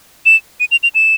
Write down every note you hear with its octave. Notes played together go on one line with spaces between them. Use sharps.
E7
D#7
F7
F7
E7